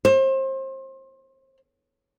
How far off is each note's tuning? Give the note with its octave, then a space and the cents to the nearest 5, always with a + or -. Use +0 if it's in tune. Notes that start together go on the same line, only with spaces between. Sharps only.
C5 +30